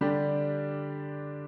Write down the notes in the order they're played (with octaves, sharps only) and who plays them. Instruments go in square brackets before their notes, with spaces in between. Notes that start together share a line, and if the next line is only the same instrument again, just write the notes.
[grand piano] D3 G3 D4 G4